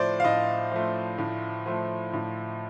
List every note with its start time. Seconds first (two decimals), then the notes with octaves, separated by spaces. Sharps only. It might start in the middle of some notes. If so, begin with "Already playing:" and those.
Already playing: A2 F3 A3 C5 D5
0.20 F5
0.24 A2 D#5
0.72 F3 A3
1.18 A2
1.66 F3 A3
2.13 A2